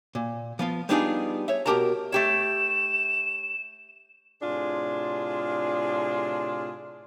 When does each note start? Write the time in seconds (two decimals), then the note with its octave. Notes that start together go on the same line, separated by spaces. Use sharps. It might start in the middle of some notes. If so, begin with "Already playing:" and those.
0.15 A#2
0.59 F3 B3 F4
0.89 G3 B3 D4 D#4 F4 G#4
1.48 C#5 E5
1.66 B2 G#3 G4 A#4 A5 A#5
2.12 A3 G4 C#5 E7
4.42 A2 C3 D4 F4 G#4 C6